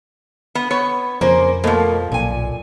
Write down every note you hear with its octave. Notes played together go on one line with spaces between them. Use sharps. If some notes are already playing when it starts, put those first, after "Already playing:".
B3
B3 C#5
F2 C#3 A#3 C5
B2 F3 A3 A#3
B1 A#2 G#5